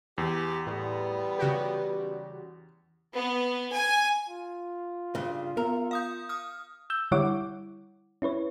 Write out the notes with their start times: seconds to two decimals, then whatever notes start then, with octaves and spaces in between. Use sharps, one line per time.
0.18 E2 G4
0.67 A2 G3 B3
1.39 C#3 F#4 G4
3.14 B3
3.72 G#5
4.29 F4
5.15 G2 C#3
5.57 B3 A#4
5.91 F5 D#6 G6
6.29 D#6 F6
6.90 E6 G6
7.12 D3 G3 E4 C#5 F#5 D6
8.22 C#4 E4 B4 C#5